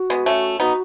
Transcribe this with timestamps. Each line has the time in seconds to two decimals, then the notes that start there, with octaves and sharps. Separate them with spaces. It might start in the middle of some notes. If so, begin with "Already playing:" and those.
Already playing: F#4
0.10 G#3 B3
0.26 A3 C#4
0.60 B3 D#4 F#4